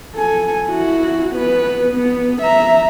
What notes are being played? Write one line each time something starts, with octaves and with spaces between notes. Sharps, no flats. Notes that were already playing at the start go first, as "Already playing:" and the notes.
A4 G#5
E4 F#4
B3 B4
B3
E5 A#5